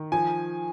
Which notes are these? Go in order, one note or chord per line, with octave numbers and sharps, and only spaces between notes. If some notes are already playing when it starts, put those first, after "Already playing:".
Already playing: D#3
F3 G#5